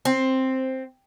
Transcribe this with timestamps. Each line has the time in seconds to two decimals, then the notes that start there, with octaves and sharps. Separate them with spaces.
0.05 C4